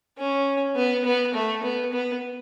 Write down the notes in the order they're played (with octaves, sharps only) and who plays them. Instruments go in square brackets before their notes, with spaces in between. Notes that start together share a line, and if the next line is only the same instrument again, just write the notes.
[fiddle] C#4
B3
B3
A3
B3
B3